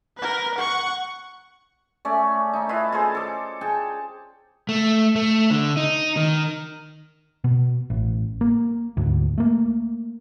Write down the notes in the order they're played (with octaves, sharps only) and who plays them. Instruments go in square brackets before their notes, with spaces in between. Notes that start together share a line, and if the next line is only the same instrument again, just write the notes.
[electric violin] A#4 B4
F#5 C#6
[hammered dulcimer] A3 C#4 D5
D#4 G5
E4 F4 B4 D#5
F4 G#4 A4 C5
A4 D6
G#4 G5 A5
[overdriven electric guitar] A3
A3
D3
D#4
D#3
[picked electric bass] B2
A1
A#3
D2 G#2
A3 A#3